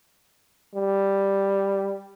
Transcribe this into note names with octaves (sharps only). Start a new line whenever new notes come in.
G3